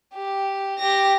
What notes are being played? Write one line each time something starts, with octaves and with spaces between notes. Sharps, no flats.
G4
G4 A#6